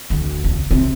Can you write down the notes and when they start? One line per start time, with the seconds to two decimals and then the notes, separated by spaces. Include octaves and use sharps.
0.10 D2
0.44 C#3
0.71 C3